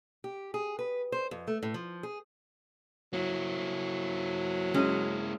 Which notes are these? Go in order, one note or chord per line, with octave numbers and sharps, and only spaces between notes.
G4
G#4
B4
C5
F2
A3
A2
F3
G#4
F#3 A#3 E4
G#3 C#4